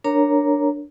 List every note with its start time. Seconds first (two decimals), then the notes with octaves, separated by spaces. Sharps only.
0.04 D4 A#4 C#5 A#5